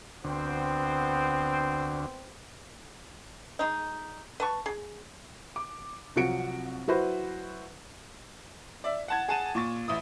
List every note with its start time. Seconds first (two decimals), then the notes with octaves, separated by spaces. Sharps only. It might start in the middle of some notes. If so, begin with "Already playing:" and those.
0.24 D2 B3 C4
3.59 G#3 D#4
4.40 B4 A5 C#6
4.66 G#4
5.56 D6
6.16 C2 F3 F#3 F#4 C#7 D7
6.88 F#3 E4 F#4 B4 C5
8.84 D5 E5
9.08 F#5 A5 G#6
9.28 G#4 F#5 A5 D#7 E7
9.55 A#2 C#6 A6
9.88 A1 E4 D#6